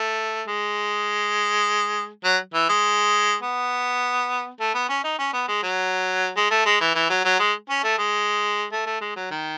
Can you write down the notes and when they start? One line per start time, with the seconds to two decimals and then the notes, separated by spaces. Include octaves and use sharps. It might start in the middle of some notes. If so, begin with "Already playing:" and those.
Already playing: A3
0.48 G#3
2.24 F#3
2.54 E3
2.69 G#3
3.42 B3
4.60 A3
4.74 B3
4.89 C#4
5.04 D#4
5.19 C#4
5.33 B3
5.48 G#3
5.63 F#3
6.37 G#3
6.51 A3
6.66 G#3
6.81 E3
6.95 E3
7.10 F#3
7.24 F#3
7.39 G#3
7.69 C#4
7.84 A3
7.98 G#3
8.72 A3
8.86 A3
9.01 G#3
9.16 F#3
9.31 D#3